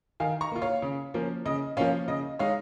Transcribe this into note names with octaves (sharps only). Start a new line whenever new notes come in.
D#3 F5 G#5
A#5 C#6
A#3 F4
C#5 F5
C#3
F3 A#3 C#4
C#3 D#5
F3 A#3 C#4 C#5 F5
C#3 D#5
G#3 D#4 C#5 F5